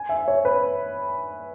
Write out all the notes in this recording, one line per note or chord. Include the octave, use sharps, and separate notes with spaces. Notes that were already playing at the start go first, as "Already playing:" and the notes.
Already playing: G#5
E5
C#5
B4